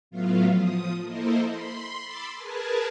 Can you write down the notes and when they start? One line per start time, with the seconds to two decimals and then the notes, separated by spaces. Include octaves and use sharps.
0.11 A2 F#3 A3 B3 F4 F5
0.49 F3 D#6
1.03 A#3 E4 A4 A#4 C5 D#5
1.44 B5 C6
2.04 B5 C6 D6 E6 A6
2.35 G#4 A#4 B4 G#5 A5